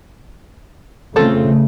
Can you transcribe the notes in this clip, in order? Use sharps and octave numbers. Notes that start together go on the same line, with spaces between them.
C#3 A3 C4 F4 A4